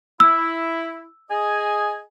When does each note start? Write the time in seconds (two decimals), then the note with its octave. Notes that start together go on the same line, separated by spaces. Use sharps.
0.20 E4 E6
1.30 G#4 D#5 G#5